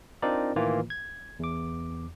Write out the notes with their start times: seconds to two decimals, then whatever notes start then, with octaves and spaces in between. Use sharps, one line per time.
0.22 C4 D4 D#4 F4 A#4 D5
0.56 A2 D#3 E3 A#3 F4
0.90 G#6
1.39 E2 D6